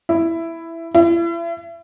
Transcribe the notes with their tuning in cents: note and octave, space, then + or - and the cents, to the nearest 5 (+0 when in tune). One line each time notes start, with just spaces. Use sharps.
E4 +10
E4 +40